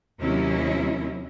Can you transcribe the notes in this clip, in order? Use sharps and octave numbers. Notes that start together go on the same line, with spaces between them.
D#2 C3 F#3 C#4 E4